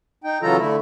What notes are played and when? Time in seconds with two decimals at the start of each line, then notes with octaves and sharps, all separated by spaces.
0.24 D#4 G5
0.42 C#3 E3 F#3 F4 A4 A#5
0.59 D3 A3 E4